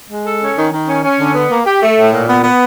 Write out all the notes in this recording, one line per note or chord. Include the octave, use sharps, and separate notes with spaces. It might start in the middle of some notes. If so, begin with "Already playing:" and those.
G#3
A4
C#4
D#3
D#3
C#4
C#4
D3
B3
A#3
G4
A3
A2
A#2
B3
B3